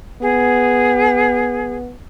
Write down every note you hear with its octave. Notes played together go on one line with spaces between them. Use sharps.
B3 G#4